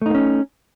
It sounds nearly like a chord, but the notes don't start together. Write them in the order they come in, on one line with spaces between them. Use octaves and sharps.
A3 D#4 A#3 C#4